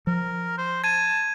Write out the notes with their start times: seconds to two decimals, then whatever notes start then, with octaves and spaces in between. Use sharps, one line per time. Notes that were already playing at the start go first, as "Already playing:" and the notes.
0.07 F3 A#4
0.58 C5
0.84 A5 G#6 D#7